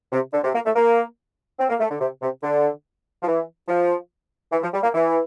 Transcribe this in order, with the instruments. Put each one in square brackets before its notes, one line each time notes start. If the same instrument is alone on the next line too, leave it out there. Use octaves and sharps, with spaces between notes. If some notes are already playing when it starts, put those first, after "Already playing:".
[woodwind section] C3
D3
C3
A#3
A3
A#3
C4
A#3
A3
D3
C3
C3
D3
F3
E3
F3
E3
F3
G3
A#3
E3